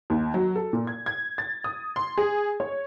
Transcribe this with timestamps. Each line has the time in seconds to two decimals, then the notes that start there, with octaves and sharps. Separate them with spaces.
0.10 D#2
0.34 F#3
0.56 A4
0.73 A#2
0.87 G#6
1.06 G#6
1.38 A6
1.64 D#6
1.96 C6
2.17 G#4
2.60 C#5